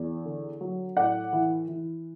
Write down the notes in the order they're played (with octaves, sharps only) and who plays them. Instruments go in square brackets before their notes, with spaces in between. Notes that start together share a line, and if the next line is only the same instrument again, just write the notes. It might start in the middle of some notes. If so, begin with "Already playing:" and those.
Already playing: [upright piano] E2
D3
F#3
A2 D5 F#5
E3
E3